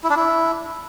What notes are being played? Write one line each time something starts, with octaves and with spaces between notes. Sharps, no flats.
E4
D4
E4